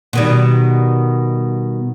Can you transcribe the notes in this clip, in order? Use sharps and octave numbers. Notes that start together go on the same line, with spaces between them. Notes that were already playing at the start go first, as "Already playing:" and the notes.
B2 D#3 G3